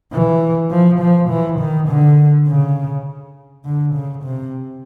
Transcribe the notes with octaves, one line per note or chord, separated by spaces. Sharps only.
E3
F3
F3
E3
D#3
D3
C#3
D3
C#3
C3